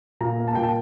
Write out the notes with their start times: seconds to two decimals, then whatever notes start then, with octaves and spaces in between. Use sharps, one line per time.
0.21 A#2 A#5
0.39 A#3
0.48 A5
0.55 A#2 G5
0.63 A5